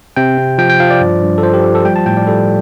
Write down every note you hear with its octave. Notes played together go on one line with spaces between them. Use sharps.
C3 G5
C4
F3 G5
G5
F3 F5
D5
G2
G2
A4
F3 C5
G4
F3
A4
G3 G5
A5
A2 G5
D5
G3 A4